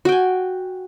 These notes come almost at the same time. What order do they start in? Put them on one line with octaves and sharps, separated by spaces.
F#4 G5 G#5